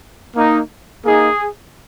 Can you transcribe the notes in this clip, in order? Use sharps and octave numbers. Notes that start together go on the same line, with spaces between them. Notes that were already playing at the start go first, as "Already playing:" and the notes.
A#3 D#4
A#3 D#4 G#4